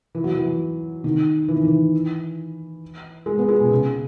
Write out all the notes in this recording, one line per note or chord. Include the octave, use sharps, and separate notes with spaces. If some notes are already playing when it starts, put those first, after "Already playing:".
E3
F#3
E3
D#3
E3
D#3
E3
G#3
B3
G#3
B2
C#3